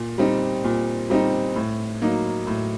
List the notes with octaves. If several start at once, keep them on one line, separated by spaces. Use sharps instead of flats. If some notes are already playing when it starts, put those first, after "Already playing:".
Already playing: A#2
G3 C4 D#4
A#2
G3 C4 D#4
A2
F#3 A#3 D#4
A2